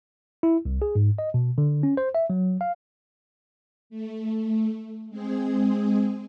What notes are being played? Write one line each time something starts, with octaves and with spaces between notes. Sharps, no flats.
E4
C2
G#4
G#2
D#5
B2
D3
C#4
C5
E5
F#3
F5
A3
G#3 C4 G#4